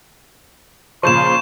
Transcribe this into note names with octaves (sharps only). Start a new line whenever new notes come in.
A#2 C#3 F3 C6 C#6 G6 E7